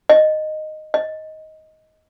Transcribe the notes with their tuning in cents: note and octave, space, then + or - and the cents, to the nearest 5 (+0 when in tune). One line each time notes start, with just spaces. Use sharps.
D#5 -10
D#5 +10